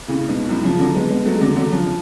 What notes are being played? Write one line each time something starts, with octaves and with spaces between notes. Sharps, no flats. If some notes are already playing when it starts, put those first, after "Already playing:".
A2 C#3
G#2 B2
F#2 A2
C#3 F3
D3 F#3
G#3 B3
G#3 B3
F#3 A3
G#3
D3 F#3
D3 F#3
C#3 F3